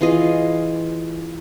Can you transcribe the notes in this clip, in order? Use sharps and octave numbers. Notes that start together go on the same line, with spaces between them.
E3 F4 G#4 D#5